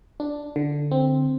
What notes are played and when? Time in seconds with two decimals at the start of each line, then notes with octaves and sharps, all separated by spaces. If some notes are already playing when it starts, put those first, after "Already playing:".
0.20 D4
0.56 D3
0.91 C4